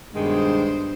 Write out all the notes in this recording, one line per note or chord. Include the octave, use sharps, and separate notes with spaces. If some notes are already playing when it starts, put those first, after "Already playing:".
G2 B2 D#3 G#3 C5